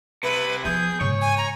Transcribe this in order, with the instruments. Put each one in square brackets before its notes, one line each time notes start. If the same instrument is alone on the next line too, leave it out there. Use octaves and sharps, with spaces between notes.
[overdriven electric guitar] C3 E4 [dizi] B4
[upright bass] F3 B3 [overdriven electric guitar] G#4 [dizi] G6
[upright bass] G#2 C#3 [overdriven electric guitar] C#5
[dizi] G#5
A#5